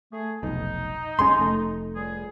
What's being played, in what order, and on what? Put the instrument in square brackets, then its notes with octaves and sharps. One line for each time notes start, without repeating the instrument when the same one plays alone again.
[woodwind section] A3 G#4
[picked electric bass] F1 B1 [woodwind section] D#4
[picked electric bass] F#1 G#3 C#4 [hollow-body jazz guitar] C6
[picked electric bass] F1 A3
[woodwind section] C#2 G3 G#4